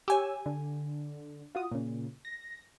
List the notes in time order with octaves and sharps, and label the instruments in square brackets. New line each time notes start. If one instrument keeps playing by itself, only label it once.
[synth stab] G4 G#5 [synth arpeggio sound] C#5 E6
[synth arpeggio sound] D3
F4 F#4 D#6
A#2 C#3
A#6